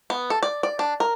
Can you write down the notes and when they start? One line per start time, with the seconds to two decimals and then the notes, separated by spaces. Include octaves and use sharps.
0.10 B3
0.30 A4
0.43 D5
0.63 D5
0.79 D4
1.00 A#4